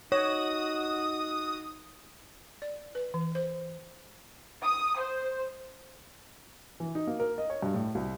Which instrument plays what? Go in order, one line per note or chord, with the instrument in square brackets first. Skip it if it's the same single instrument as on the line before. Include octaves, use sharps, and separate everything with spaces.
[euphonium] D#4 [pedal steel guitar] F#4 [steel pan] C#5 [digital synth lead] D#6
[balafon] D5
B4
E3
C5
[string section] D#6
C5
[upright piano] E3
D#4
A#3
A#4
D#5
C#5
G2
A2
C2